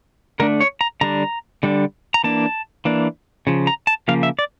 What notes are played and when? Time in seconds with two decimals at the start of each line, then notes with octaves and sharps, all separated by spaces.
0.40 D3 A3 D4 A#4
0.60 C#5
0.81 A#5
1.01 D3 G3 D4 A#5
1.63 D3 G3 D4
2.14 A#5
2.24 E3 A#3 D4 A5
2.85 E3 A#3 D4
3.47 C#3 F3
3.67 A#5
3.87 A5
4.08 C#3 F3 A#3 F5
4.23 E5
4.39 D5